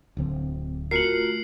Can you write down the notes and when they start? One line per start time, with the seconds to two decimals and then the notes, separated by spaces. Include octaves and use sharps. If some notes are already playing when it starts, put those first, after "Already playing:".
0.17 D1 D3 C4
0.91 A3 F4 F#4 A#4 C7 C#7 F#7